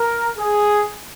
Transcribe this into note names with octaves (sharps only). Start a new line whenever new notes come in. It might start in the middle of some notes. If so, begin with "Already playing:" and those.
Already playing: A#4
G#4